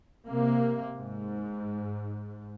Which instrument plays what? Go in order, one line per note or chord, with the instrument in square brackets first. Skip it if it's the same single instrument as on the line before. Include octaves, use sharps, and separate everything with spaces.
[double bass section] C3 A#3
G#2